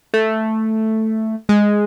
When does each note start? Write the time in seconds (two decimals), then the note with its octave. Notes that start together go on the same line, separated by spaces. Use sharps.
0.14 A3
1.49 G#3